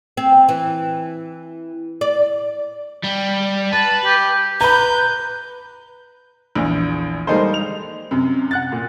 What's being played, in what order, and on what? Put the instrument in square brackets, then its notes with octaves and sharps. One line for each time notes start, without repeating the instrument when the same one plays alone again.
[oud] C4
E3
D5
[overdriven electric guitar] G3
[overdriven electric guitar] B4 [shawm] A5
[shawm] G4
[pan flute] B4 [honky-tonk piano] A#5 B5 [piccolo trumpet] G6
[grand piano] A#1 E2
G3 G#3 A#3 D#4 A4 C5
F7
F#2 C3
F#5 F#6 A6
A#2